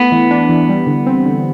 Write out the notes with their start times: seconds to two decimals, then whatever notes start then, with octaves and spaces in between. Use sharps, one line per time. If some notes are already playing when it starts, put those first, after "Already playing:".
Already playing: A3 B3 E4
0.12 E3
0.31 D4
0.49 E3
0.69 G3
0.87 D3
1.06 C4
1.25 D3